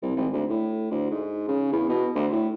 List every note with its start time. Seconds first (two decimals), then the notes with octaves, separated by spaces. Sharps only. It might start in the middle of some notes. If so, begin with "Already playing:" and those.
0.02 C2
0.16 G#1
0.33 D2
0.50 A2
0.91 D2
1.11 G#2
1.48 C#3
1.72 E2
1.89 B2
2.15 D2
2.32 A2